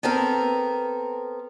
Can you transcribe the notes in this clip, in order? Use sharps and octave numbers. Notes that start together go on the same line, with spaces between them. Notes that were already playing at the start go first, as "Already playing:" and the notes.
B3 C4 A4 A#4